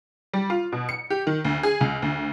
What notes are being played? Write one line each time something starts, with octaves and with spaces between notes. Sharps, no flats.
G3
F4
B2
C#7
G4
D#3
D2
G#4
C#2
D2